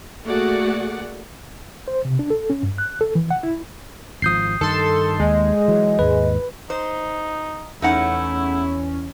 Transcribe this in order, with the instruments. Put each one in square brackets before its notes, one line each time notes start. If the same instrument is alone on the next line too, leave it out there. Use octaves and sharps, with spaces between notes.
[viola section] A3 A#3 F#4 G#4 D5 F#5
[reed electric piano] C5
C3
D4
A4
C#4
G2
F#6
A4
E3
F#5
E4
[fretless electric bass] G#1 F3 [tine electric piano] D#6 G6 C7
[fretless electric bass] G2 D#3 [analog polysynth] A4 C6
[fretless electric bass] D#2 [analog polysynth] G#3 [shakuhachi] D#5
[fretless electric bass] E3 F#3
[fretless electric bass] D#2 G#2 [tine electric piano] B4
[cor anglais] D#4 [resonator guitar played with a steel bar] C5
[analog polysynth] E2 C#4 [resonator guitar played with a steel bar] A3 D#4 F#5 [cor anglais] E4